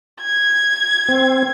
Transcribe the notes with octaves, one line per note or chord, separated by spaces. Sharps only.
G#6
C4